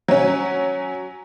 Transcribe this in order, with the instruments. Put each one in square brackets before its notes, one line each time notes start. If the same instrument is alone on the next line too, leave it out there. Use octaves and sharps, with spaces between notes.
[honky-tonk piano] F#3 C#4